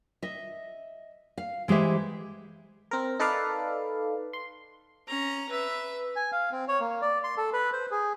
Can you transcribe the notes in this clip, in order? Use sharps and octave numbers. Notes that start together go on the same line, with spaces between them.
D#5 E5
F5
E3 G#3 G4 C5 E5
C4 A#4
D#4 A4 B4 D5 F5
C6
C#4 A#5
B4 E5
G#5
F5
C4
C#5
A#3
D5
C6
A4
B4
C5
G#4